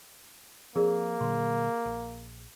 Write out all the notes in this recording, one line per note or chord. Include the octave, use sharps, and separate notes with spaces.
F3 A#3 C4 G#4 A#4 D5
A#2 D3 F#3 C6
A#1